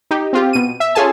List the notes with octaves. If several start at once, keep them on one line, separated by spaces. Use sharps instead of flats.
D#4 G4
C4 F4 G4
B2 D#7
E5
C#4 F4 G#4 A4 G#5 A5